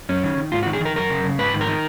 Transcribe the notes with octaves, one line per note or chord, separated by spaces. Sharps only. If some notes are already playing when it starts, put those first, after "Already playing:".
F#2 C#4
D#3
D#3
G#2 F4
F#4
D#3
G#4
D#3 A#4
F#2 A#4
C#3
C#3
G#2 B4
D#3
A#4
D#3